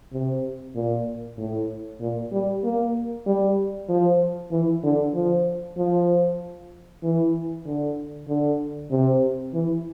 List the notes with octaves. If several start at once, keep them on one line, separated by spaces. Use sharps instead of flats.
C3
A#2
A2
A#2
G3
A#3
G3
F3
E3
D3
F3
F3
E3
D3
D3
C3
E3